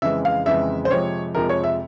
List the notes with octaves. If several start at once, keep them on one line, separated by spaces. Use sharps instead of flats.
F2 C#3 E3 G#3 E5
F5
F2 C#3 E3 G#3 E5
C5
F2 C3 F3 G#3 C#5
F2 C3 F3 G#3 A#4
C#5
E5